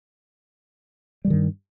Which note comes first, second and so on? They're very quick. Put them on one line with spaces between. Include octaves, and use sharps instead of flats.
G3 D3 D#3 G2